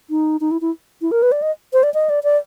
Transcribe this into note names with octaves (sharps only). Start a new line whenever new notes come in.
D#4
D#4
E4
E4
E4
A#4
B4
D5
D#5
C5
D5
D#5
D5
D5